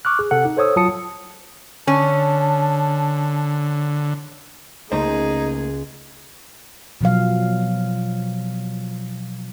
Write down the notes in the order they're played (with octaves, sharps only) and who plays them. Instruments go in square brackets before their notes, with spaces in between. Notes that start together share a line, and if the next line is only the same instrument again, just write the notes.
[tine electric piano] C#6 D6 F6 F#6
G#4
C3 A4 F#5
D#4
A4 C5 C#5 D#6 E6
F#3 F4 A5 D#6 C#7
[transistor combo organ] D3 [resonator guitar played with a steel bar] C#4 [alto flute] A5
[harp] C#2 [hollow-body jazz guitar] A3 A#3 C5 [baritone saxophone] D#4 [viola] G#4
[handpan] B2 F3 F#3 F5